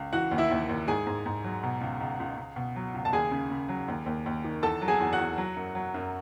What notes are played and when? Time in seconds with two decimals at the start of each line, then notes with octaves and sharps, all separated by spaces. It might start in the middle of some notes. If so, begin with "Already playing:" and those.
Already playing: C#2
0.13 E3 F#4 F#5
0.31 D#2
0.38 E4 E5
0.51 D#2
0.69 D#2
0.87 G#2 G#4 G#5
1.07 G#2
1.26 G#2
1.44 F#3
1.63 B2
1.81 C#2
2.01 C#2
2.20 C#2
2.37 C#2
2.56 B2
2.76 F#3
2.94 C#2
3.05 A5
3.13 D#2 G#4 G#5
3.32 C#3
3.50 C#3
3.69 F#3
3.88 D#2
4.06 D#2
4.26 D#2
4.44 D#3
4.63 E2 A4 A5
4.81 F#3
4.88 G#4 G#5
5.00 E2
5.12 F#4 F#5
5.18 E2
5.38 F#3
5.56 F#2
5.75 F#3
5.94 F#2